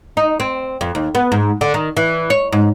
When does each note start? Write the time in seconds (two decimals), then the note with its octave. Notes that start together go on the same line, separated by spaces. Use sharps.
0.17 D#4
0.40 C4
0.81 F2
0.95 D#2
1.15 B3
1.32 G#2
1.61 D3
1.74 D#3
1.97 E3
2.30 C#5
2.52 G#2